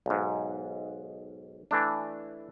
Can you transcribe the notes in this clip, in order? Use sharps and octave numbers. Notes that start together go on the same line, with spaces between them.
B1 G#2
E3 A3 D4